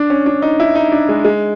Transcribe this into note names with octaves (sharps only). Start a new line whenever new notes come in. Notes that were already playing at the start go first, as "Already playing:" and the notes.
Already playing: D4
C#4
D4
D#4
E4
D#4
D4
G#3
G#3